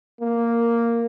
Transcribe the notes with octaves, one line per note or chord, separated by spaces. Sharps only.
A#3